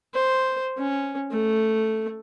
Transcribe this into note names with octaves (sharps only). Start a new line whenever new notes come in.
C5
C#4
A3